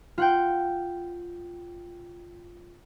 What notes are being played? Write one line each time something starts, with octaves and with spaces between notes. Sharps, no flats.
F4 F#5 G5